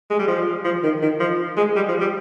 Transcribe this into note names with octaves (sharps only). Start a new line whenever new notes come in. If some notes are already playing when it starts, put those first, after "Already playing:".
G#3
G3
F3
F3
D#3
D#3
F3
G#3
G3
F3
G3